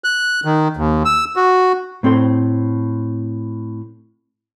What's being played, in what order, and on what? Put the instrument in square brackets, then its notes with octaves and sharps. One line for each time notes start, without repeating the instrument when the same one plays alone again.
[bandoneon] F#6
D#3
D#2
E6
F#4
[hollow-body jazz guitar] A2 C4 A4 C5